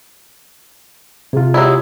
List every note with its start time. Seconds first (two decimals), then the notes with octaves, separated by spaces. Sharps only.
1.33 C3 F4 G#4
1.54 F#3 G#3 E4 G4 D#6 G#6